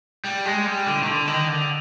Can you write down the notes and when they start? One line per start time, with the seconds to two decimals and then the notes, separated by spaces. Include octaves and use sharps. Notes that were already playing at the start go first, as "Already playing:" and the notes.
0.24 G3
0.45 G#3
0.66 G3
0.86 D3
1.03 D#3
1.07 D3
1.27 D#3
1.48 D3